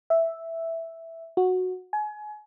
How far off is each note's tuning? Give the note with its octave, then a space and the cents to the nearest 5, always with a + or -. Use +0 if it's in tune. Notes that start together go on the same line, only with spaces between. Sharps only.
E5 +0
F#4 -10
G#5 +30